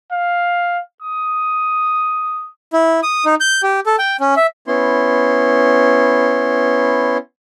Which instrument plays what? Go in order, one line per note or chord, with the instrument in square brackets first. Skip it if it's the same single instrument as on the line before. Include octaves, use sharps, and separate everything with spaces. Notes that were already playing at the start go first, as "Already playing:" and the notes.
[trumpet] F5
D#6
[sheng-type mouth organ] E4
D#6
D#4
G6
G4
A4
G5
C#4
E5
B3 C#4 E4 C6